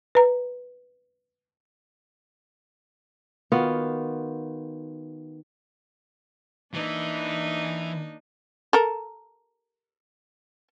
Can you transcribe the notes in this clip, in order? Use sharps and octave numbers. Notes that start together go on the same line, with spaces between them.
B4 A#5
D#3 B3 F4 F#4
E3 A#3 D4 D#4
A4 A#4